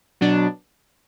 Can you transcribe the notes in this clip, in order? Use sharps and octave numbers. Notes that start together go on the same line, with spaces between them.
B2 F#3 B3 D4